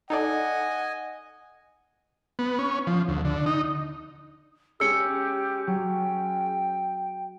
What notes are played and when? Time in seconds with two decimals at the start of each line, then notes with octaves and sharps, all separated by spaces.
0.10 D#4 A4 D5 D#5 F#5 G#5
2.39 B3
2.59 C#4
2.87 F3
3.08 D2
3.25 D3
3.46 D#4
4.80 G#3 C#4 G4 E6 C#7
5.67 F#3 G5 C#6 D7